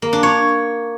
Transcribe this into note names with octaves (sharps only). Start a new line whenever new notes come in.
A#3
D4
C#5